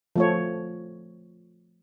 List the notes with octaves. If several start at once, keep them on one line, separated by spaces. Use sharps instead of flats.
F3 A3 C#5